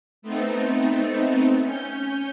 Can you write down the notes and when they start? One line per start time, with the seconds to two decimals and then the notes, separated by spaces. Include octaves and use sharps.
0.22 A3 B3 C4 D#4
1.62 C#4 G6